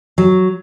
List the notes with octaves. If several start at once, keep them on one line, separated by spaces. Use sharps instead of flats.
F#3